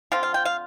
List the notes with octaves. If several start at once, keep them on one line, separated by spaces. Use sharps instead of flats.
D3 F3 C4 F4 F5
F5
G5
F5